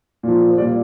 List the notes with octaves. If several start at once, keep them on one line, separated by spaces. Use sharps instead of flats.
A#2 F3
C5
A#2 G3 D5